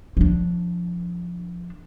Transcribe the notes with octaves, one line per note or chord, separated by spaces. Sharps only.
F3 D4